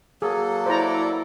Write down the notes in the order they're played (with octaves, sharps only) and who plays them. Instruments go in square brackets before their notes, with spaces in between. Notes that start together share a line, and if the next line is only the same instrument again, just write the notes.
[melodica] F#3 A#3 A4 [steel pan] G#4
[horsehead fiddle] E4 D5 [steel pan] C5 A#5